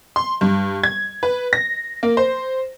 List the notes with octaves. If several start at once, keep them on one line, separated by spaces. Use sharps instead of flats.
C6
G2
G#6
B4
A#6
A#3
C5